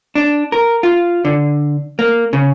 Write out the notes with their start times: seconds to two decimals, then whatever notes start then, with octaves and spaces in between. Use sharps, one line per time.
0.15 D4
0.52 A#4
0.83 F4
1.25 D3
1.99 A#3
2.33 C#3